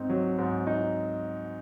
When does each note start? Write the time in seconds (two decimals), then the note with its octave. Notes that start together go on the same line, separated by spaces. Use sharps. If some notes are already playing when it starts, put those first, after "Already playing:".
Already playing: G#2 C4 D#4
0.10 F#3
0.38 G#2
0.67 D#4